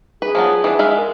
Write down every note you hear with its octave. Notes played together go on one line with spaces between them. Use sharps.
G#4 B4
F3 F#3 B3
E3 D4
G#3 E5 F5
A#4